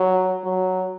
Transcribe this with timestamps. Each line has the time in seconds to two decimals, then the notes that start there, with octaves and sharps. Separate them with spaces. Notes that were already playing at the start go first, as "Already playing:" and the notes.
Already playing: F#3
0.44 F#3